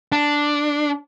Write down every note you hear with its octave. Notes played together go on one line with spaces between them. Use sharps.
D4